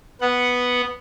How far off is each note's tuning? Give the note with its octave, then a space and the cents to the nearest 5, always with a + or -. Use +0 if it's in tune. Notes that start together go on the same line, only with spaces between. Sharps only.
B3 +0 F#5 +0